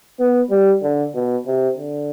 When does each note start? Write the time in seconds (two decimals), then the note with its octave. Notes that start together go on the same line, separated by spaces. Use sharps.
0.20 B3
0.50 G3
0.83 D3
1.15 B2
1.46 C3
1.77 D3